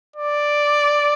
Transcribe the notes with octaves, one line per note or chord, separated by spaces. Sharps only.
D5